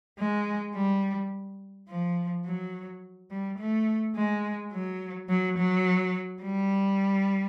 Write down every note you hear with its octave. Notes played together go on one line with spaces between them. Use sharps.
G#3
G3
F3
F#3
G3
A3
G#3
F#3
F#3
F#3
G3